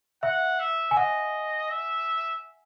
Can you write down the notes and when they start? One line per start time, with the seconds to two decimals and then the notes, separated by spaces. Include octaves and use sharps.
0.23 E5 F#5
0.59 E5
0.91 G#5
0.97 D#5 F#5
1.70 E5